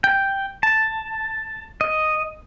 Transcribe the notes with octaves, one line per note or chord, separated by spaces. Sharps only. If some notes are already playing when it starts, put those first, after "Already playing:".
G5
A5
D#5